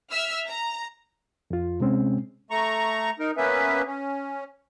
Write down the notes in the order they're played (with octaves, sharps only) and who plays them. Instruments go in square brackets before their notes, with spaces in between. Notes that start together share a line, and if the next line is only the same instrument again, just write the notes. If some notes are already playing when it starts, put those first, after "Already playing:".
[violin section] E5 E6 F6
A#5
[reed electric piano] F2 F4
C3 G#3 C4 C#4
[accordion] A3 A#5 C#6
D#4 A#4
A#3 B3 C#4 B4 E5
C#4